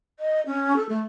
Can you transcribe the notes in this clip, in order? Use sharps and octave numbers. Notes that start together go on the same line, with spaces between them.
D#5
C#4
A4
A3